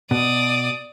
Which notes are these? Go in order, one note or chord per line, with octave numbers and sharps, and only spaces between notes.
B2 D5 D#6